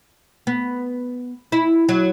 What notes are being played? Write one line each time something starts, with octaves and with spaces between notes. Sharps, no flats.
B3
E4
F#3